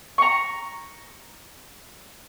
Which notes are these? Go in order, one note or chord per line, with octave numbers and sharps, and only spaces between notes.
A#5 C#6